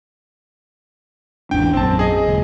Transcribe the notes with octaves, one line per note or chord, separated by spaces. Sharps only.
G#1 E2 D4 G5
A#1 F#2 C4 A5
G#4 D#5
D#1 C#2